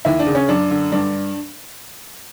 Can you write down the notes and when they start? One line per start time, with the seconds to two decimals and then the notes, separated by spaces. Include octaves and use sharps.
0.05 D#2 E4
0.19 D4
0.27 C#3
0.35 C#4
0.48 F#2 D4
0.71 D3
0.92 G2 D4